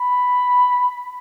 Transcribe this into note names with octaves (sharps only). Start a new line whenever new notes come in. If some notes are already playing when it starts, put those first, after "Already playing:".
Already playing: B5